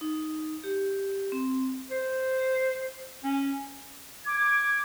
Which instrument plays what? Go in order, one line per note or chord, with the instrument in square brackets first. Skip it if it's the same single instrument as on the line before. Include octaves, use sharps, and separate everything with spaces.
[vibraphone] D#4
G4
C4
[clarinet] C5
C#4
[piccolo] D6 [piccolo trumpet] G#6